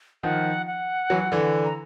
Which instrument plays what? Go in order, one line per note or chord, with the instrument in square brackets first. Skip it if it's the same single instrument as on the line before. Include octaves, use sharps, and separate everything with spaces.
[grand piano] D#3 F3 [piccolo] F#5
[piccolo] F#5
[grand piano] E3 F#3
D3 E3
[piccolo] A#5